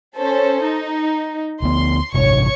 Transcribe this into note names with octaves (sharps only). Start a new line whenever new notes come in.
C#4 A4 C5
D#4
D2 B3 C6
A1 G2 C3 C#5 C#6